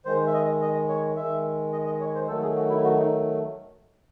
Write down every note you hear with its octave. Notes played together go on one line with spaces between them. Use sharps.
D#3 G#3 C5
E5
D#5
D#5
C#5
D#3 G#3 E5
D#5
D#5
C#5
C5
D#3 F#3 A3 A4
G#4
F#4
E4
F#4
D#4